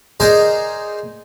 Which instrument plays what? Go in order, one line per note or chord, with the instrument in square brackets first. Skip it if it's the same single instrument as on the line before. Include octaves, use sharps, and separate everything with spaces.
[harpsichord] D#4 G#4 A#4 C5 D5 D#5